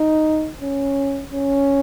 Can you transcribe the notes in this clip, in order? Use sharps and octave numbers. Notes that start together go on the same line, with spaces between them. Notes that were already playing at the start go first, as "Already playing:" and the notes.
Already playing: D#4
C#4
C#4